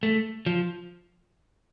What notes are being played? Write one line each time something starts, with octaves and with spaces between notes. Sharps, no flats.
A3
F3